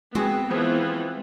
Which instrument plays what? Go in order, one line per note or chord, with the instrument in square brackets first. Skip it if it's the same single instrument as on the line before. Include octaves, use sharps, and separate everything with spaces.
[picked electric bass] G#3 [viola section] B3 [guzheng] C4 [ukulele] F#4 G#4
[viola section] E3 F3 B3 [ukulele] G4 G#4 C5